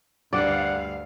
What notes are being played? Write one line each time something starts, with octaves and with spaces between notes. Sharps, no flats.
D2 G2 D3 D5 F5 F#5